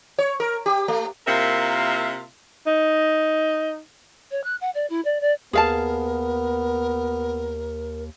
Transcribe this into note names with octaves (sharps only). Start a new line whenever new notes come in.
C#5
A#4
G4
A3
C3 A#3 E4 F4 A#4 E5
D#4
C#5
F#6
F#5
D5
E4
D5
D5
D#2 B3 G#4 A#4 F5 A5